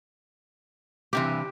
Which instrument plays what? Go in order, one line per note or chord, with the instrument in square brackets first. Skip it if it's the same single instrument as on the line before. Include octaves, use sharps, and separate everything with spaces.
[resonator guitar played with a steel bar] G2 C3 E3 [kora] G4